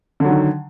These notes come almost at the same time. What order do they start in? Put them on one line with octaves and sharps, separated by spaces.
D3 F#3 D#3